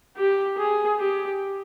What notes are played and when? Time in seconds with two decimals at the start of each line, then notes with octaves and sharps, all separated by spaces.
0.17 G4
0.58 G#4
0.99 G4